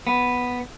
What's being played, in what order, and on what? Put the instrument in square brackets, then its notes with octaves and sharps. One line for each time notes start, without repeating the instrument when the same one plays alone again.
[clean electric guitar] B3